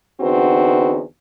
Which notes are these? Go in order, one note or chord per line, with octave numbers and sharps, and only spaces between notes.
E2 D3 C4 D#4 F#4 B4